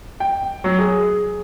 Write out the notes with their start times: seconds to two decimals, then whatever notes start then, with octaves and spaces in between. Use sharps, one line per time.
0.20 G5
0.64 F#3
0.79 G#4